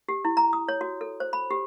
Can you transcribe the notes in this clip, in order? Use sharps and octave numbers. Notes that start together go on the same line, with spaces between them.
G4
E4
A#5
D#6
C#5
F#4
A4
C5
B5
G4